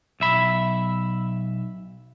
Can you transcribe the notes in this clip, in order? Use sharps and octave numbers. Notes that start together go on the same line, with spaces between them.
B1 E5 B5